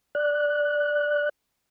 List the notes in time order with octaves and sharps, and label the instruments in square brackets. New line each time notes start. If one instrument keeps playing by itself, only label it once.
[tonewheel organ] D5 F#6